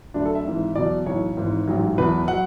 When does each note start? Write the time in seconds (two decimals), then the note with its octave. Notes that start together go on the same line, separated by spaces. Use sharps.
0.14 D2 D3 F#3 D4
0.25 A4
0.35 E5
0.45 G#1 G#2 E3
0.75 E2 B2 F#3 D5
1.06 B1 A2 E3 C#5
1.37 G#1 G#2 E3
1.68 A1 G#2 F#3
1.98 E2 B2 F#3 B4
2.28 F#3 F#5